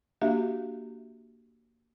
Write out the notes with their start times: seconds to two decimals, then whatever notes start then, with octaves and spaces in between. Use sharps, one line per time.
0.22 A#3 D4 F#4 G4 E5 F5